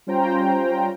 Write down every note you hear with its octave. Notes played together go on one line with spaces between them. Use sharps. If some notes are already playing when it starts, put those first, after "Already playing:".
G3 C#4 F4 C5 G5 A#5